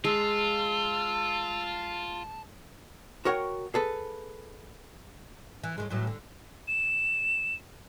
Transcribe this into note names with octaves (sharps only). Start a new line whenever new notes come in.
G#3 F4 A5 E6
F#4 A#4 C#5 F#5 G5
G#4 A4 B4
E3
A2 D#3 G#3
A2 E3 F#3
D3
E7